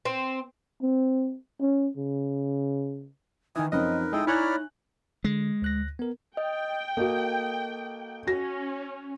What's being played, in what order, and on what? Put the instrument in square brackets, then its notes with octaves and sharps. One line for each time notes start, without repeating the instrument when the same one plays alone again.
[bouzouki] C4
[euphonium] C4
C#4
C#3
[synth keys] D#3 E3 [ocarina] D#4 [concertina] G#5 D#6
[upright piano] F#2 F3 C4 [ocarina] D#4 [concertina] A#4 B4 [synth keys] D#5
[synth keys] G#3 [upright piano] E4 [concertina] A4 G5 D#6
[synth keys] E4 C#5 A#5 [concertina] D5 B5 F6 [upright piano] G#5 F#6
[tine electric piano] D3 [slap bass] G#3
[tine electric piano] D2 F#6 A#6
B3 A#4
[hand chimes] D#5 [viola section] G5
[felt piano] A#3 F#4 [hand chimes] A4 D#5
[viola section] C#4 [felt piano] F#4 A#6